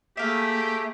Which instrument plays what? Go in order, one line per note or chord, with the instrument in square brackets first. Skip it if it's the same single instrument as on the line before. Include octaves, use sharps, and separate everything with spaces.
[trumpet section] A3 [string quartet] A#3 G#4 [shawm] G4 [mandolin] E5 F5